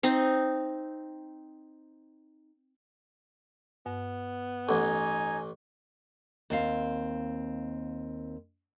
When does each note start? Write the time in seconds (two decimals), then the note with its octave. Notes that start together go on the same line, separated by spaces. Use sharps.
0.03 C4 D#4
3.86 G2 B3
4.69 A1 D#4 A4 F#5 G#5
6.50 D#2 C4 F5